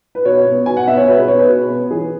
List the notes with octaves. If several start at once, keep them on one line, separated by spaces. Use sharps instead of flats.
B4
B2 C#5
B3
B2 G#5
F#5
B3 E5
C#5
B2 B4
G#4
B3 C#5
B4
B2
B3
E3 G#4